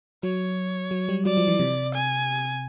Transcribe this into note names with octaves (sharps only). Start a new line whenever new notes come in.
F#3 C#5
F#3
G3
F#3 D5
F3
E3
C3
G#5